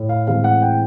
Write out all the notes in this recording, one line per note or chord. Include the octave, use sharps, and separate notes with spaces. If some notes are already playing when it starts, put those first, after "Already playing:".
Already playing: A2
F5
A2 E3 G#3 C4 F5
F#5
G5